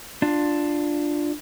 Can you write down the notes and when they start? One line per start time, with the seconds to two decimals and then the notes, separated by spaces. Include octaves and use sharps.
0.22 D4 F4